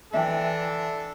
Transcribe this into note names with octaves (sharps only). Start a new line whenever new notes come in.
E3 D4 A4 E5 G5